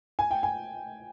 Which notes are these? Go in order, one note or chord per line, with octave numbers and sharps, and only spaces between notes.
G#5
G5
G#5